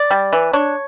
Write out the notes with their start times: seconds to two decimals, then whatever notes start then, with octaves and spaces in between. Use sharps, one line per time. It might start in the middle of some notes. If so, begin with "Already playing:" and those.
Already playing: D5
0.11 G3
0.33 E3
0.53 D4 C#5